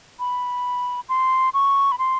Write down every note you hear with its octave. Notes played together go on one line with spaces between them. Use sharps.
B5
C6
C#6
B5
C6